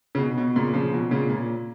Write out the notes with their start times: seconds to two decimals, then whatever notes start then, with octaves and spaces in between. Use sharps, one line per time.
0.15 C#3
0.18 B2
0.38 B2
0.56 A#2 C#3
0.74 C#3 F3
0.93 B2
1.11 A#2 C#3
1.29 A#2